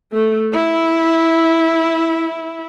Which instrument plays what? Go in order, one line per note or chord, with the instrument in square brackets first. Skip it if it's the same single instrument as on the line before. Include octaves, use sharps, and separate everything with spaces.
[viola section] A3
E4